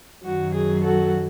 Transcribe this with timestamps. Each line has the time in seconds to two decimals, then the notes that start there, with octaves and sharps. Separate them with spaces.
0.24 F#2 D#3 F#3 F#4
0.54 G#4
0.83 F#4 A4